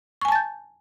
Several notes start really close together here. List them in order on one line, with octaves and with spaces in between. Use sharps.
C#6 G#5 A5 A6 G6